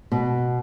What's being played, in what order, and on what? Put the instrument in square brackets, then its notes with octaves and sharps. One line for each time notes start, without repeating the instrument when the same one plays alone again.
[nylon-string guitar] B2